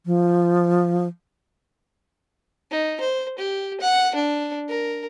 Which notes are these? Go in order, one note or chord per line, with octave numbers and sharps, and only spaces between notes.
F3
D#4
C5
G4
F#5
D4
A#4